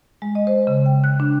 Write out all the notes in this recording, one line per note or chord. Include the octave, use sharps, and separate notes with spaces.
G#3
D#5
C5
C#3
G5
F#6
D4